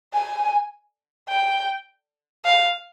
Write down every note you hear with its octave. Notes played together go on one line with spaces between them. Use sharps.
G#5
G5
F5